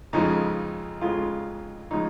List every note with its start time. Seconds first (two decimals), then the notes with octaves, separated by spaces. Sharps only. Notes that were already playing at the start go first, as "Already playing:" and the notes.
0.13 F2 C#3 F3 G#3 D#4
1.01 F2 C#3 F3 G#3 F4
1.91 C#3 F3 G#3 D#4